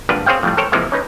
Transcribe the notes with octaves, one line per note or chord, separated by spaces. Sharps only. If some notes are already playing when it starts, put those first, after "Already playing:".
G#1 G2 A#2 D4 B4 F5
C4 G#4 C5 C#5 F5 G5
F2 A2 G3
A4 A#4 C5 C#5 G5
C3 E3 F3 G#3 A#3
C#4 D#4 B4